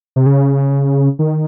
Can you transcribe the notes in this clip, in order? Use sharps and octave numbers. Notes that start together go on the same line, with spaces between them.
C3
C#3
D#3